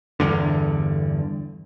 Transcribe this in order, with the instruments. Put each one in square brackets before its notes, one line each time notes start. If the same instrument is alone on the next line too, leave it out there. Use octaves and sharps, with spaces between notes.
[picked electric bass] G1 E2 G2 D3